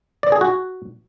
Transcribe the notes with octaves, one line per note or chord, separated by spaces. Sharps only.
D5
G#4
F#4